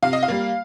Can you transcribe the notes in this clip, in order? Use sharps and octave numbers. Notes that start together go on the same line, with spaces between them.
C3 F5
D#5
F5
G3 A#3